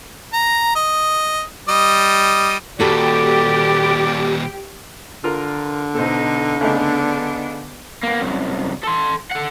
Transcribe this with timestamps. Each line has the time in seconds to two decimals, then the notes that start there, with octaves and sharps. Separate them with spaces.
0.33 A#5
0.76 D#5
1.69 G3 D#5
2.80 D#2 A#2 F#4 G4 A4 B4 D5
5.24 D3 F4 A#4
5.95 B2 D#4 A4 C5
6.61 C#3 A3 B3 D4 D#4
8.03 A#3 B3
8.21 C2 F#2
8.83 A4 C6
9.31 A4 F#5